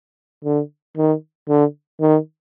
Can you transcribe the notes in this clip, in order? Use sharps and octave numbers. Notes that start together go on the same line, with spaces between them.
D3
D#3
D3
D#3